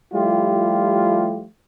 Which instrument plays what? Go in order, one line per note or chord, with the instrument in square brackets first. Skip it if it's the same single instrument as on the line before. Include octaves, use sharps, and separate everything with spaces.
[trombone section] F3 G3 A3 E4 F4 G4